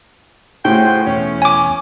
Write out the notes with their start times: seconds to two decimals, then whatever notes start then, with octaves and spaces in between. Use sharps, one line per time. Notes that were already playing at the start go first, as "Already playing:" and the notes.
0.65 A2 F#4 G#4 C5 G5
1.07 E2 B2 C#4
1.42 G#5 D6